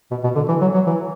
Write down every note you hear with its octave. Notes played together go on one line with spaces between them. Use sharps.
B2
B2
D3
E3
F#3
F#3
E3